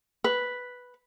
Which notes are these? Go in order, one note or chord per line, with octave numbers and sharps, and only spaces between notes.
B4